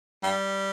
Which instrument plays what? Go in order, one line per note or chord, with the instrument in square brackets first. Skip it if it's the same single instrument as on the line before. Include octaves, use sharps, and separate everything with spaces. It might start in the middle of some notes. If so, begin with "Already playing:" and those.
[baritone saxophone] G3